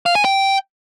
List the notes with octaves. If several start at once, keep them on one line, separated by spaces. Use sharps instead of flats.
F5
G#5
G5